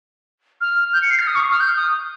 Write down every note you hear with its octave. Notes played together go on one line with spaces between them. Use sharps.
F6
G6
C#7
C7
F6
D#6
C#6
D#6
F6
G6
D#6